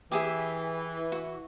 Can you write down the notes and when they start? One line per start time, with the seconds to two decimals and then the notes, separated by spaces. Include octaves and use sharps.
0.12 E3 G4 G#4 E5
1.12 F#4